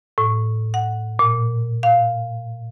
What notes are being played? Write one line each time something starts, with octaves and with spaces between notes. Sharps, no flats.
A2
F#5
A#2
F5